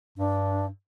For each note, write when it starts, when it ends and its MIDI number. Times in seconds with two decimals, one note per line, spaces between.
0.18 0.68 43
0.18 0.66 62